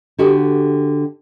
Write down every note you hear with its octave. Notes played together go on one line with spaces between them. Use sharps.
D3 F#4 G4